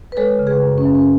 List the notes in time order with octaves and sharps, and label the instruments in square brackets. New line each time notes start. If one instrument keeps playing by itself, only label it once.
[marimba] B4
G#3 A4 C#5
C#3
G#4 B4
F#2
C#4
F#2
C#4